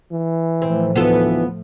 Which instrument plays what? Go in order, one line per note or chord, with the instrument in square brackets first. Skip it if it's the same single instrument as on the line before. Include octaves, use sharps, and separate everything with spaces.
[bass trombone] E3
[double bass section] A2 F3 A3 [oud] C4
[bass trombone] D2 [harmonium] E3 [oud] B3 F4 A4